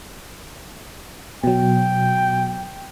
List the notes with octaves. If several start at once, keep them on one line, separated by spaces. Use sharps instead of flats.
B2 F#3 G5